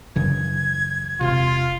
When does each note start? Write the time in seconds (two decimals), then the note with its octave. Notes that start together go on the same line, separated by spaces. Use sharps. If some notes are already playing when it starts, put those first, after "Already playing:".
0.16 F#2 C#3 E3 G#6
1.21 E1 C3 F4